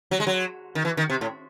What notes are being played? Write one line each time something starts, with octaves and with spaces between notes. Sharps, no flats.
F#3
G#3
F#3
D#3
E3
D#3
C3
A2